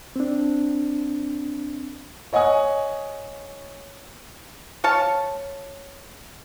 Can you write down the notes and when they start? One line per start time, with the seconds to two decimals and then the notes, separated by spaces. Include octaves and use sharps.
0.16 C4 D4
2.33 C#5 D#5 F#5 G#5 D#6
4.84 C#5 F5 A5